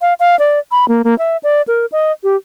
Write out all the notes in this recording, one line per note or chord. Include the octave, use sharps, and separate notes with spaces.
F5
F5
D5
B5
A#3
A#3
E5
D5
A#4
D#5
G4